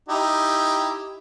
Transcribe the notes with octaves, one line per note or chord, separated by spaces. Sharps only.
D#4 E4 G4